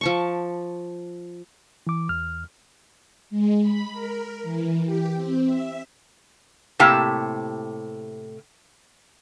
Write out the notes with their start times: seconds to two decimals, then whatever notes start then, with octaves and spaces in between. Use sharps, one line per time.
0.01 F3 A5 C#6
1.87 E3 D6
2.09 E2 F6
3.30 G#3
3.62 B5
3.92 A#4
4.43 E3
4.85 G4
5.15 C4
5.45 E5
6.79 A2 C3 A#3 G4 G5 A5